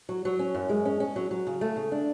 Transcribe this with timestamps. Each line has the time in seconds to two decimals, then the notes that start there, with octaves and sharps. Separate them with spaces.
0.09 F#3
0.25 F#3
0.39 C#4
0.54 F#2
0.70 G#3
0.85 C#4
1.00 C#4
1.16 F#3
1.31 F#3
1.47 C#3
1.61 A3
1.76 C#3
1.92 D4